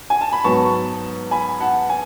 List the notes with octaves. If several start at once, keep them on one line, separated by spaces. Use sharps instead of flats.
G#5
A5
B5
G#2 F#3 B3 A5 C#6
G#5 B5
F#5 A5
G#5